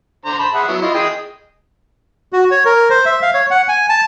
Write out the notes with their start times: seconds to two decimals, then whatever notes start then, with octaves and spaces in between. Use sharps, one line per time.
0.25 D3 C5 A#5
0.39 C5 A5 B5
0.55 G#4 E5 F#5
0.68 F#3 B3 E4
0.82 E4 F4 D#5
0.95 G#4 D#5 G5
2.33 F#4
2.51 C#5
2.65 A#4
2.90 C5
3.06 E5
3.22 F5
3.34 C#5
3.51 F#5
3.68 G#5
3.90 A5